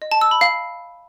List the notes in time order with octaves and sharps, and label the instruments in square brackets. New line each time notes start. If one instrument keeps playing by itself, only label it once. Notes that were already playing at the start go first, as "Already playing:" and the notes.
[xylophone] D#5
A5
E6
B5
F5